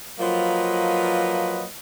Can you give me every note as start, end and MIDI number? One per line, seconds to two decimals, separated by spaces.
0.20 1.66 53
0.20 1.66 54
0.20 1.66 58
0.20 1.66 65
0.20 1.66 71
0.20 1.66 75